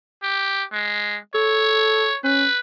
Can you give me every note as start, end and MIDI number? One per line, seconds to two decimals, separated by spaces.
0.23 0.64 67
0.73 1.18 56
1.35 2.10 69
1.35 2.18 73
2.24 2.46 61
2.24 2.59 71